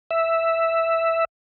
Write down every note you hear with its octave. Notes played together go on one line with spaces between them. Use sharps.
E5